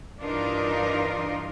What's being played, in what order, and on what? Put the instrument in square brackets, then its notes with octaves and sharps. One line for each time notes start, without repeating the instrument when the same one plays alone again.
[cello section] G2 E3 D4 D#4 F4 A#4